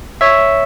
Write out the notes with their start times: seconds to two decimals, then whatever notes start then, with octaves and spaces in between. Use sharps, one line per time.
0.21 C#5 E5